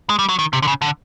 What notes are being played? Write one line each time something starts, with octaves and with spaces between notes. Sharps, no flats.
G#3
G3
F#3
D#3
C3
D3
C#3
D3